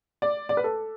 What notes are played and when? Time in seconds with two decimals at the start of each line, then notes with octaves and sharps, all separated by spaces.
0.22 D5
0.49 D5
0.57 B4
0.64 A4